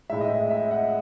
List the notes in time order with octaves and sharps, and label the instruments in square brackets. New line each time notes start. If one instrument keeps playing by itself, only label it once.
[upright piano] A2 G#3 E5
D#5
E5
E5
D#5 F#5